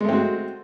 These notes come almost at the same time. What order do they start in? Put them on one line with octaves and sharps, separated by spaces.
G#3 A3 C4 F#4